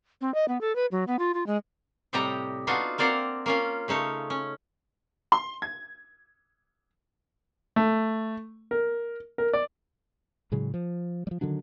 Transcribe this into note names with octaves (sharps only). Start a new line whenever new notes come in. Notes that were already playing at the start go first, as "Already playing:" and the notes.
C4
D#5
B3
A4
B4
F#3
B3
F4
F4
G#3
A2 C3 G3 G4 D#5 A#5
B3 D4 D#4 F4 F#4
A#3 C4 D5 F5 F#5 A#5
A#3 C#4 F4
C#3 A3 D#4 C#5
C#4
C6
G#6
A3
A#4
A#4
D5
A2 C#3 F#3 G#3
F3
F3 G3
D3 D#3 F#3 D4